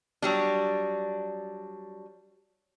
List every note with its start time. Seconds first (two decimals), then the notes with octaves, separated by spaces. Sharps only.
0.22 F#3 G3 D4